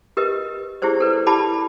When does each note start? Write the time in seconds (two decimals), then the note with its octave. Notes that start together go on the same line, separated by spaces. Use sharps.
0.17 G4 A#4 B4 D#5
0.82 E4 G4 G#4 C5 D5
1.00 A4 B4 D5
1.26 E4 G4 D5 A5 B5 D6